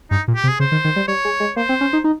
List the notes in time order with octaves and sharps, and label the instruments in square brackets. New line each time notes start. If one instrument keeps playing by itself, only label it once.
[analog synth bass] G2 [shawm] D#4
[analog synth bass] A#2
[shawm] G4
[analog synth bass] C3
[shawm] G#4
[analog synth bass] C#3 [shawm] C5
[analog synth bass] D#3
D#3
G3
[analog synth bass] G3 [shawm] C#5
[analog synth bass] G#3
G#3
[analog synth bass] A#3 [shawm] C5
[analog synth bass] C4
C#4
D#4
D#4